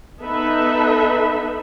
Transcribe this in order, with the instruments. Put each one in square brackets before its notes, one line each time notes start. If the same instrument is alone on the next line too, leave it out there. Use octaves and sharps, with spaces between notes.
[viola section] B3 D#4 A4 B4 E5